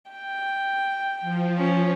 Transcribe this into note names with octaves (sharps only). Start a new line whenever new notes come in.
G5
F3
C#4